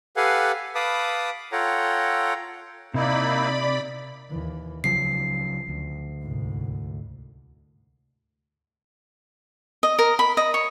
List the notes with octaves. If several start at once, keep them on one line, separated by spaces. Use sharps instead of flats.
G4 A4 B4 F5 F#5 G#5
B4 F5 A5 B5 D6 D#6
F4 A4 C#5 F#5 G5 A#5
C3 A#3 D#4 E4 D5 B5
D#2 E3
C#2 C#3 F3 F#3 C7
D2
C2 G#2
D#5
A#4
B5
D#5
C#5